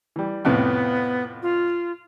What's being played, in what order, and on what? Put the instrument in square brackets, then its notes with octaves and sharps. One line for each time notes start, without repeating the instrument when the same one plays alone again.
[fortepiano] E3 G3
[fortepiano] F2 A2 C3 [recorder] B3
[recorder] F4